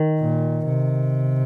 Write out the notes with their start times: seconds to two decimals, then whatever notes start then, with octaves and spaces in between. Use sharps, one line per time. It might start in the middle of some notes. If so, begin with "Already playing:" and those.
Already playing: D#3
0.20 A#2
0.67 C3